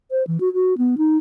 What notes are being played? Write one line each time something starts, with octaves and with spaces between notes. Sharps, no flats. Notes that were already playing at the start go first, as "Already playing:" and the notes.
C5
E3
F#4
F#4
B3
D#4